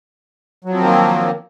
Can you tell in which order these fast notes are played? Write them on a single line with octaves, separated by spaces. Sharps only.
F#3 F3 C4 D#3 A#3